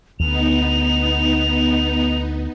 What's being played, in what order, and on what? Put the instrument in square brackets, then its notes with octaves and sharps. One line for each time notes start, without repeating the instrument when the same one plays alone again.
[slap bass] D2 [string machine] B3 D#4 [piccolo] F7